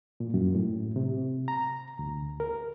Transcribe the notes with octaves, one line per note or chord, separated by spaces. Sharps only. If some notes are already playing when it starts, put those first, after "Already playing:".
A#2
F#2
A2
C3
A#5
D2
A#4